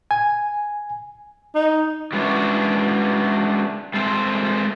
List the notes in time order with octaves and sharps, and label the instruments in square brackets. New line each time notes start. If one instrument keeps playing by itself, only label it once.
[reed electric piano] G#5
[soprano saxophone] D#4
[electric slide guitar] F#3 G#3 B3 C#4 D4 E4
G#3 A3 C4 C5